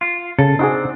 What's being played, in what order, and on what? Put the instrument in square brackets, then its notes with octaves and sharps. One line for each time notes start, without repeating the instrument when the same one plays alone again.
[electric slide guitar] F4
[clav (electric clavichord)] C#3 [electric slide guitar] A4
[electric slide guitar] C4 D4 [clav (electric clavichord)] D#4 F#4 G#4